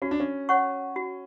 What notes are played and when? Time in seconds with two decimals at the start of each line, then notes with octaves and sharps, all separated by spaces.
0.02 C#4 F#4
0.11 D4
0.20 C#4
0.49 C#5 F#5 C#6
0.96 F#4